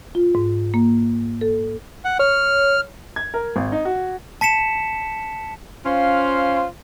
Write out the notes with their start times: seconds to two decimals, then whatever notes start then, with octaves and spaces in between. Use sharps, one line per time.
0.15 F4
0.35 G#2
0.74 A#3
1.41 A4
2.05 F#5
2.19 C#5 F6
3.16 G#6
3.34 A#4
3.56 G#1
3.72 D#4
3.85 F#4
4.41 A5 B6 C#7 E7
5.85 C#4 F4 C5 F5